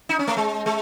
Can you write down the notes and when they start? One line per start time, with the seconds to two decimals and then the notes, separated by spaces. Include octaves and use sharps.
0.09 D#4
0.19 C#4
0.27 A3
0.37 G#3
0.66 G#3